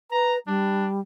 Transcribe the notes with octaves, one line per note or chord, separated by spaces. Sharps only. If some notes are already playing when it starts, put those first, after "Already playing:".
B4 A#5
G3 D4